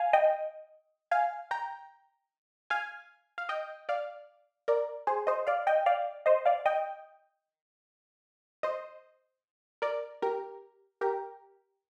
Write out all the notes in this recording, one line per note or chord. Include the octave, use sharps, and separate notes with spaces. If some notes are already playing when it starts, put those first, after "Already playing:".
Already playing: F5 G#5
D#5 G5
F5 G#5
G5 A#5
F5 G#5
F5
D#5 G5
D5 F5
A#4 D5
G#4 C5
C5 D#5
D5 F5
D#5 G5
D5 F5
C5 D#5
D5 F5
D#5 G5
C5 D#5
A#4 D5
G4 A#4
G4 A#4